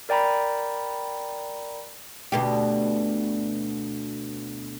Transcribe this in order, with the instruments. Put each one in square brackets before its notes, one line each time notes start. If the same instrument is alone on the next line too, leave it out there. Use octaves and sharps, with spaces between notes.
[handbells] A#4 D5 G5 A#5 B5
[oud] D2 B2 G4